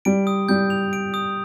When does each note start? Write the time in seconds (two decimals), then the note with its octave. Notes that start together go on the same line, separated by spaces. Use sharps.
0.05 G3 D7
0.27 D#6
0.49 G3 G6
0.70 F7
0.93 D7
1.14 D#6